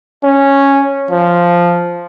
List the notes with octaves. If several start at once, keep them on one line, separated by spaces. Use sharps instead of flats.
C#4
F3